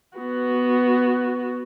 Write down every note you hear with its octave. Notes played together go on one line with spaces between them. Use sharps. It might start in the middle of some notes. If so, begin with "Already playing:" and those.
B3 F#4